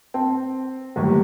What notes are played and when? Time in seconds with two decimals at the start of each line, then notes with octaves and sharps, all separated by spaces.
0.14 C4 A5
0.96 G1 D#2 A2 F#3 G3 G4